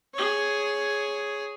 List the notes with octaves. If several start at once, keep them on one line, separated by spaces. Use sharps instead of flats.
G#4 C#5